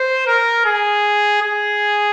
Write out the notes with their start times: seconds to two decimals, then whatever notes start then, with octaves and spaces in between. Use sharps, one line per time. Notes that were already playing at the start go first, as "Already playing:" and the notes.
Already playing: C5
0.27 A#4
0.65 G#4
1.42 G#4